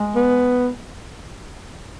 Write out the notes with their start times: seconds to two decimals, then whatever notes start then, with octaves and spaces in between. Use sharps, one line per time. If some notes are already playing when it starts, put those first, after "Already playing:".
Already playing: G#3
0.15 B3